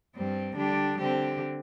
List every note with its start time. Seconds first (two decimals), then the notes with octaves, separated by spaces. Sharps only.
0.14 G2 G3 C4
0.56 D3 G3 D4 G4
0.98 D3 C4 G4